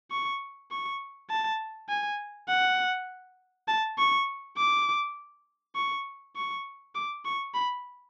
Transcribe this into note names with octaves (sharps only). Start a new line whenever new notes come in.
C#6
C#6
A5
G#5
F#5
A5
C#6
D6
C#6
C#6
D6
C#6
B5